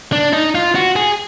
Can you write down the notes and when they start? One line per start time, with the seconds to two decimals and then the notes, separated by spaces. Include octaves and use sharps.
0.12 D4
0.33 D#4
0.55 F4
0.75 F#4
0.96 G#4